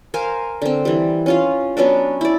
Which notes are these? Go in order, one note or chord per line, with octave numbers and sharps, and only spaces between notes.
A#4 C5 F5 G#5
D3 C4
E3 G3
C#4 F4 F5
F#3 B3 C#4 D4
E4 D5